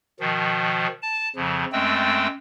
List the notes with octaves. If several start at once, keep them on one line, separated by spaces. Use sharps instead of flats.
B2 D#3 F3
A5
F2 C#3 F3
F#2 G#3 A3 C4 G5